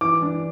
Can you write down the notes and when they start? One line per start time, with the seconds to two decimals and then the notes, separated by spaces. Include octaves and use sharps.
0.01 E3 D6
0.22 D4